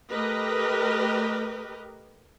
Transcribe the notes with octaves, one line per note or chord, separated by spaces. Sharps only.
A3 G4 A#4 B4 D#5